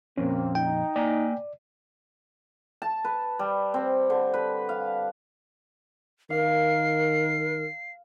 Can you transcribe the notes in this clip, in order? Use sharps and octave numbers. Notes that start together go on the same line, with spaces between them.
F2 A#2 A#3 C4 C#4
D#4 G5
A#3 D5 G#5 A#5
A5
B4
G3
C4
D3
B4
F5
D#3 A#4 F5 C7